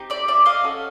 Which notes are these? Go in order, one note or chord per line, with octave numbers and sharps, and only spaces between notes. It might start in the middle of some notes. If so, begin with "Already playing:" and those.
Already playing: C4 D#4 G4
D5 E5
D5 E5
D#5 F5
C#4 F#4 A4